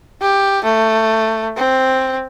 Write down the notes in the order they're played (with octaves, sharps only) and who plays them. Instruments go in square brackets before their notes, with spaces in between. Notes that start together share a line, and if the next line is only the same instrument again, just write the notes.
[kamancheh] G4
A3
C4